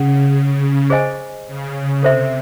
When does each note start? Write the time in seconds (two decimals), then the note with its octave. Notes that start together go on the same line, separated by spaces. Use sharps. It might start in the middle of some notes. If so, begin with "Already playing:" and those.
Already playing: C#3 F#5
0.90 G#4 C5 D#5 G#5
1.47 C#3
2.03 C3 A4 C5 E5